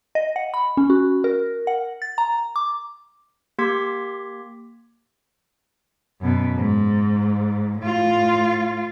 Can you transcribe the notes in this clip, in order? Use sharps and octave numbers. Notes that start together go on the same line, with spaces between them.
D#5
F#5
B5
C#4
F#4
A#4
F#5
A6
A#5
D6
A#3 G4 C6 D6 G#6 B6
F#2 B2
G#2
A2 F4